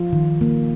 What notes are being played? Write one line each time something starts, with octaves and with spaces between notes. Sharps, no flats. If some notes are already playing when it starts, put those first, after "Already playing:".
Already playing: F3 F4
D#3
A#3